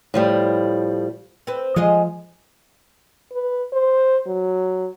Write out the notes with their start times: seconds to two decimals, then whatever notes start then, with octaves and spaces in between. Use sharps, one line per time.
0.14 A2 F3 G3
1.47 C4 B4
1.76 F3 G#3 G#4 D#5
3.32 B4
3.73 C5
4.27 F#3